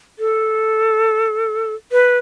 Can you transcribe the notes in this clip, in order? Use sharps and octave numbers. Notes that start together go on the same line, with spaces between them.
A4
B4